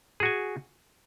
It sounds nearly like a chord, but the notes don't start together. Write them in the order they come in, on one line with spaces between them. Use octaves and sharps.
G#4 F#4 G#5